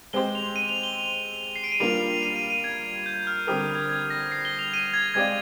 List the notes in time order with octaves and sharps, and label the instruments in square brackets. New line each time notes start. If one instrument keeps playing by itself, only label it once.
[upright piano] G#3 C4 G4 C5 [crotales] G7
[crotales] F7
D#7
F7
G7
C7
D7
D#7
[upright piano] G3 A#3 D4 F4 A#4 [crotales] F7
[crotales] D#7
D#7
D#7
G#6
G6
F6
[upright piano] D3 G3 C4 G4 A#4 [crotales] D#6
[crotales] G6
G#6
G#6
A#6
C7
G7
F7
D#7
G#6
[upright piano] G#3 C4 G4 D5 F5 [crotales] G#6